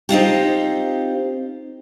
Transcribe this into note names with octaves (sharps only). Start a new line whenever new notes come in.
C4 D#4 F4 G4